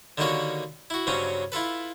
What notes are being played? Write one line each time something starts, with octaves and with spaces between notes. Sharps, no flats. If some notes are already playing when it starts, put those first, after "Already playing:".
D3 D#3 G3 A#3 F#4 C#5
E4 F#4
G2 C#3 F#3 C4 C#4
E4 F4 A4 B4